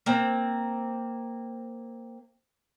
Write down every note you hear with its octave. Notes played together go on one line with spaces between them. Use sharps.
A#3 C4